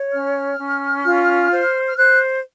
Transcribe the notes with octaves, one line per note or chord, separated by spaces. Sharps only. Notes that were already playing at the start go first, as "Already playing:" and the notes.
Already playing: C#5
C#4 F6
C#4
F4
C5
F6
C5 F#6